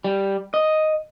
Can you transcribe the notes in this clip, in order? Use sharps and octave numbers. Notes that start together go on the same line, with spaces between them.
G3
D#5